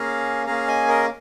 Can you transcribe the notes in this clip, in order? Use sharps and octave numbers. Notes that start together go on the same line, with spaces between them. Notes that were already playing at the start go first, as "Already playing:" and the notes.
Already playing: A#3 C#4 G#4 F5 A#5
A#3 C#4 G#4 F5 A#5
D#5 G#5
A#4 D#5